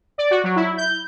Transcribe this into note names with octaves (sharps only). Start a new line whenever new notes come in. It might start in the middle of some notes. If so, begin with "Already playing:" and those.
D5
F#4
F#3
E4
G6